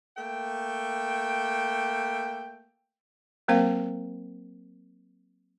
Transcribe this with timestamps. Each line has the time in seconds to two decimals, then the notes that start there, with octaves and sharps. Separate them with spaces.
0.17 A3 A#3 G5
3.48 F#3 A#3 C4 A#4 C5 F5